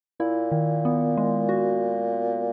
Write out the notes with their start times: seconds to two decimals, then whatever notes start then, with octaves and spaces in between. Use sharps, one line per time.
0.20 A#2 E4
0.52 D#3
0.85 B3
1.17 G#3
1.49 F#4